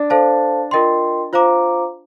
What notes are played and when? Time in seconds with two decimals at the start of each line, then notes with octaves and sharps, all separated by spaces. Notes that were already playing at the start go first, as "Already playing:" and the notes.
Already playing: D4
0.10 A4 C5 F5 A5
0.71 F4 A#4 D#5 G5 C6
1.33 F4 C5 F5 A#5 D6